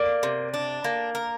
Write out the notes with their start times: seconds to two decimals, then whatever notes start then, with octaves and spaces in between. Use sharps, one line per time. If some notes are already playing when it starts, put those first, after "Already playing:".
Already playing: A#3 D5
0.23 C3
0.54 D4
0.84 A#3
1.15 A#4